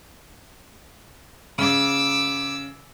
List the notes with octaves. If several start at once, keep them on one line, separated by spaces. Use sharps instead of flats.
C#3 D6 E6